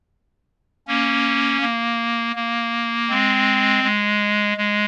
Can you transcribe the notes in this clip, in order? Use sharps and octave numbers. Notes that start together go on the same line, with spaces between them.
A#3 C#4
A#3
A#3
G#3 C4
G#3
G#3